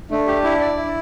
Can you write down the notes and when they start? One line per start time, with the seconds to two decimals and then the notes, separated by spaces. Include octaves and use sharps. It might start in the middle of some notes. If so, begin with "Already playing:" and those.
0.11 A3 D4
0.27 G4
0.44 E4
0.61 D5
0.77 E4